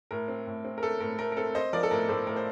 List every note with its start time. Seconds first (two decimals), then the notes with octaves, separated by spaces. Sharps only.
0.11 A2 A#4
0.28 C4
0.47 A2
0.65 C4
0.78 A#4
0.83 A3 A4
1.00 A2 A#4
1.19 A3 A#4
1.32 A#4
1.37 C4 A4
1.55 C4 C5 D#5
1.73 F3 A#4 D5
1.83 A4
1.91 A2 A#4
2.09 A2 A4 C5
2.27 A2 A#4
2.36 C5